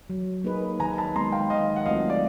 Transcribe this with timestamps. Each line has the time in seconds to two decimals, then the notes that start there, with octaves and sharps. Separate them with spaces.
0.10 F#3
0.44 A#3 D#4 G#4 B4
0.80 D#3 G#5 A#5
0.98 A5 B5
1.15 G#3 B3 A#5 C6
1.32 F5 G5
1.50 D#3 D#5 F5
1.76 F#5
1.86 F#3 A3 C4 F4 D#5 F5
2.10 D5